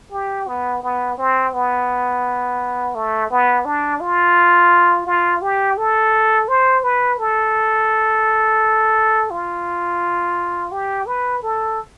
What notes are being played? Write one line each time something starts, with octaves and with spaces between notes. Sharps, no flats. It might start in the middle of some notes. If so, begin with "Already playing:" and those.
G4
B3
B3
C4
B3
A3
B3
D4
F4
F4
G4
A4
C5
B4
A4
F4
G4
B4
A4